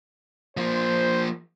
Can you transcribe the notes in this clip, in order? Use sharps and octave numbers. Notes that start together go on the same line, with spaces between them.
F3 A#3 C5